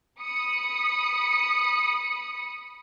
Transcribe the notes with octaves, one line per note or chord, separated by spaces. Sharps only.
B5 D#6 C#7